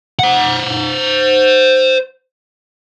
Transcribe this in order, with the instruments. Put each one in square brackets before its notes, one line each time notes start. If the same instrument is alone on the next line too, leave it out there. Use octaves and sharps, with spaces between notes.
[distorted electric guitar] C5 F#5